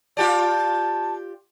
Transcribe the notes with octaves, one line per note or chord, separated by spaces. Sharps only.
F4 G4 D5 A5